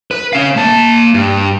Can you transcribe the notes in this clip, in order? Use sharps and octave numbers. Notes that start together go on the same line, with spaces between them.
B4
C#4 F5
A#3 A5
G2